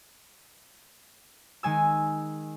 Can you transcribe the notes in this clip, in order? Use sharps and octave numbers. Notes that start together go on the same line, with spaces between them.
D#3 G#3 G#5 E6